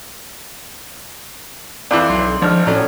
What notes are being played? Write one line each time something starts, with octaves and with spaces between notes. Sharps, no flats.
F2 E3 D5 D6
B1 C6 C7
G#1 F3 D4 D5 F6
A2 F#3 C#4 A4 D5